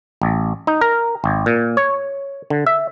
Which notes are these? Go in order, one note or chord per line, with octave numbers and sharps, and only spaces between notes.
A1
D#4
A#4
G#1
A#2
C#5
D3
E5